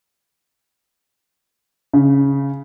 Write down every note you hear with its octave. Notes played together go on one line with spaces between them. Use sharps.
C#3